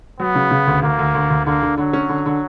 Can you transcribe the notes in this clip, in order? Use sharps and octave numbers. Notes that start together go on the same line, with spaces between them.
F#3 B3
C#3
C#3
D2
D2 A#3
D2
D2
D2
D3 A#3
D3
D3 F#3
C#4
D3
D3